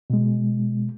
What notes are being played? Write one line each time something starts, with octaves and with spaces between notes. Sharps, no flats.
B2 G#3